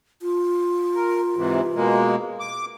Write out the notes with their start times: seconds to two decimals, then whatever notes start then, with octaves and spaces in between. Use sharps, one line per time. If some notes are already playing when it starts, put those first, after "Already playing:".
0.22 F4
0.95 A#4
1.36 G#2 C3 E3
1.75 B2 G#3 A#3
2.40 D6